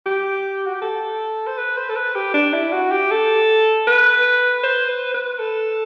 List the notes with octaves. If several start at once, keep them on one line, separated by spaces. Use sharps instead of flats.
G4
F#4
G4
A4
C5
B4
C5
A4
B4
G4
D4
E4
F#4
G4
A4
B4
C5
B4
B4
A4